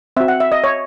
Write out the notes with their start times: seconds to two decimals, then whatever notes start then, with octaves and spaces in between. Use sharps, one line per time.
0.17 C4 E5
0.20 F#4
0.28 F#5
0.40 E5
0.52 D#5
0.64 C#5